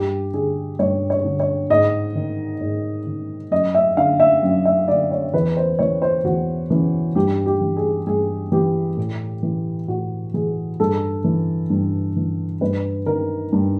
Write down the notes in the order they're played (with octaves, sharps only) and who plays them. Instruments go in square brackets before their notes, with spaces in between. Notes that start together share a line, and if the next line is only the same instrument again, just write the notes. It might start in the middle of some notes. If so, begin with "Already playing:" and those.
Already playing: [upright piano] G2 G4
D3 G#4
G2 C#5
C#5
D3
C#5
G#2 D#5
D#3
G#2
D#3
F#2 D#5
E5
D3 F5
E5
F#2
E5
D3 D5
C#5
E2 B4
C5
C#3 E3 C#5
C5
E2 F#4
C#3 E3
G2 G4
G4
E3
G#4
G2 G#4
E3 G4
A2
E3
A2 F#4
E3 G#4
G2 A4
E3
G2
E3
G2 B4
D#3 A#4
G2